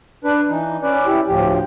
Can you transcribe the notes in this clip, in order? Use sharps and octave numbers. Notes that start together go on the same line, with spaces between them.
D4 B4
E3 D#4
C#4 B4 D5
E4 G4
D2 A2 F3 G4